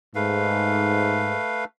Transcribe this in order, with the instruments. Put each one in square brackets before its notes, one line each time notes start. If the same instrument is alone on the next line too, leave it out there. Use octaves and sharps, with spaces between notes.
[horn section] G#2 [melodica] A3 B4 F5